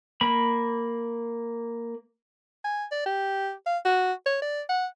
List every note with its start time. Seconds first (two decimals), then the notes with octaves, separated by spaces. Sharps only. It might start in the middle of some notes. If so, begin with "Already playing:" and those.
0.21 A#3 B5
2.65 G#5
2.91 D5
3.06 G4
3.66 F5
3.85 F#4
4.26 C#5
4.42 D5
4.69 F#5